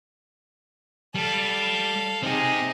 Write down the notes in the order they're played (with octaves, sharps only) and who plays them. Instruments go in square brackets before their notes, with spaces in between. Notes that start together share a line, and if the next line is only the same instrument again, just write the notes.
[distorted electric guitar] G3 [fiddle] A4 F5
[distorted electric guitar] C4 G4 [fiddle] D#4 G#4